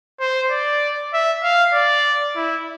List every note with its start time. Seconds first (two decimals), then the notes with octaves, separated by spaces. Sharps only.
0.20 C5
0.51 D5
1.13 E5
1.43 F5
1.74 D5
2.36 E4